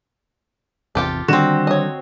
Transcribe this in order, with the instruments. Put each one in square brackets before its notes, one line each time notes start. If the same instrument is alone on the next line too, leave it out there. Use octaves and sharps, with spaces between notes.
[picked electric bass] G#1 E2 C3 [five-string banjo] F4 G4 A4
[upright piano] D3 E7 [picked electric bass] D#3 F3 G3 [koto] C4 F#4
[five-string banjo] C#5 D#5